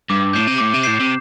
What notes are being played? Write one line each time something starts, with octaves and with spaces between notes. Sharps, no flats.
G2 D6
A2 G6 C7 E7
C3
A2 D6
C3
A2 G6 C7 E7
C3